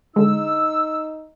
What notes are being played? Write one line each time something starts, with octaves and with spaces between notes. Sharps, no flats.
D3 G#3 D#4 E6